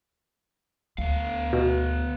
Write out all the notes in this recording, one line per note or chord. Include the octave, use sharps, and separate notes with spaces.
D2 B3 F5
B2